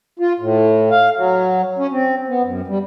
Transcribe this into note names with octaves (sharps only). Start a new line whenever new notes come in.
F4
A2
F5
F#3
C#4
C4
B3
F#2
G3